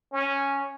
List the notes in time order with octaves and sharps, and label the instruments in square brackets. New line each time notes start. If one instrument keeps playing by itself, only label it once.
[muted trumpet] C#4